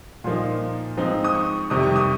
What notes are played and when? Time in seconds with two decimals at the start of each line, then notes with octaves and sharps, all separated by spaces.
0.24 A#2 F3 A#3 D#4 C6
0.97 G#2 F3 C4 D#4
1.24 D#6
1.35 C#6
1.70 F2 C3 D#3 G3 D#6
1.83 C#6
1.96 D#6